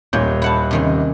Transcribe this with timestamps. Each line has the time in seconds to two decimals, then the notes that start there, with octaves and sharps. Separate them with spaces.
0.13 D#1 A#2 C#5 G6
0.42 E4 F#5 A5
0.71 C3 D#3 C#4